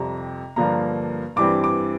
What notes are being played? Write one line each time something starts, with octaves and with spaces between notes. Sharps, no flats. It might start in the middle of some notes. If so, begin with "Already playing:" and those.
Already playing: F2 C3 G3 A#5
G2 D3 F3 A#3 A#5
G2 E3 G3 C4 D6
D6